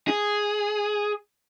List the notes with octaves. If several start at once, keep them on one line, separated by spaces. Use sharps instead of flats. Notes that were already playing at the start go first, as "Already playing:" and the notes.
G#4